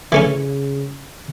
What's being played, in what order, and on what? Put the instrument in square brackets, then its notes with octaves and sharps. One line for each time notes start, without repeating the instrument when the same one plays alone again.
[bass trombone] C#3 [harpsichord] E3 A3 C#4